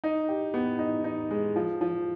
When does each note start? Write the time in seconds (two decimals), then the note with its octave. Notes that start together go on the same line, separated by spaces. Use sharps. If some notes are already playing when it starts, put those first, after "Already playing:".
0.04 D#4
0.28 G4
0.54 B3
0.79 D#4
1.04 D#4
1.31 G#3
1.56 F3
1.81 F3